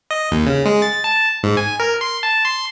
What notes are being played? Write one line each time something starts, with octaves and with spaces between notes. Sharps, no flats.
D#5
D#2
C#3
G#3
A6
A5
G#2
G#5
A#4
C6
A5
C6